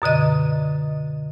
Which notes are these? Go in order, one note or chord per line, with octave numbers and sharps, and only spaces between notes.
F#2 B2 D3 D#5